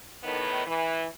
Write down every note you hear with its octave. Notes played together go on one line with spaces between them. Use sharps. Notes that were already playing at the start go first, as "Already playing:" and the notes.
A2 D#3 B3
E3